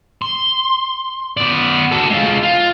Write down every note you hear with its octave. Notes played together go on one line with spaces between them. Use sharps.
C6
B3 D5
F#4 A4
G#3 F4
F4